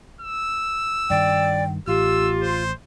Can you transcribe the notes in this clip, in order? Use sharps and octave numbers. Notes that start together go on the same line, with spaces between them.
E6
G2 D#3 D5 G5
A1 F4 G4 E6
C5